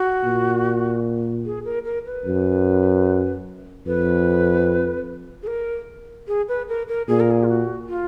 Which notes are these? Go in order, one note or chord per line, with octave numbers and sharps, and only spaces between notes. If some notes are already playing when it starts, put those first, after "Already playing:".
Already playing: F#4
A#2
G#4
A#4
A#4
B4
F#2
F2 B4
G#4
A#4
G#4
B4
A#4
A#4
A#2 G#4
A#4
G#4
F4
F#4
F4